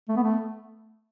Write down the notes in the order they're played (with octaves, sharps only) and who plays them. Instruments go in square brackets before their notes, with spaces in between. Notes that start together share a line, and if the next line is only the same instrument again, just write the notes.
[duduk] A3
B3
A3